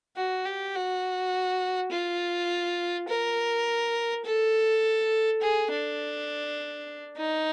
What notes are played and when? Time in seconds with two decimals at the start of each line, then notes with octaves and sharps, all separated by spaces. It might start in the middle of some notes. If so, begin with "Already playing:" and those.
0.16 F#4
0.45 G4
0.75 F#4
1.92 F4
3.08 A#4
4.25 A4
5.42 G#4
5.71 D4
7.17 D#4